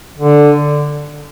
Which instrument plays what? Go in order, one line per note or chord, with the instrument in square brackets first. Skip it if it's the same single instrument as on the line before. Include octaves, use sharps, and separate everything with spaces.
[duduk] D3